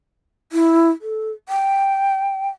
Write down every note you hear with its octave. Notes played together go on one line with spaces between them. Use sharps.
E4
A4
G5